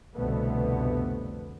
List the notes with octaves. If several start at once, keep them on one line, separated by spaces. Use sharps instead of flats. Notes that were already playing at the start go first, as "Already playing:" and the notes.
C2 F2 B2 D3 A3 B3